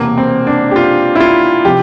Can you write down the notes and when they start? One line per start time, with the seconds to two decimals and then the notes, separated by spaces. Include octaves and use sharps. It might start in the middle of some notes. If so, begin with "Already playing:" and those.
Already playing: E1 E2 C3 A#3
0.18 C4
0.47 D4
0.71 G4
0.76 F4
1.15 E4
1.20 F4
1.65 C3 F3 G4